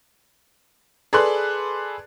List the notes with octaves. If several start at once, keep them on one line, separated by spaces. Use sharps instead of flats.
G#4 A4 B4 D5 C6 F#6